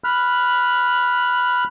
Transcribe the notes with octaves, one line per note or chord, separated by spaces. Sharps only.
B5 F6 F#6